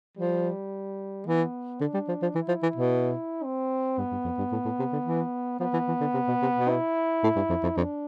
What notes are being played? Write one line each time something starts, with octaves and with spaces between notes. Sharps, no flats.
F3 G3
E3 B3
D3 D4
G3
F3
F3
E3 E4
F3
E3
B2
C4
G2 B3
G2
F2
G2
A2
A2
C3
D3
E3
F3 B3
E3
E3
D3
C3
B2
C3
B2
E4
A2
G2
F2
F2
F2 D4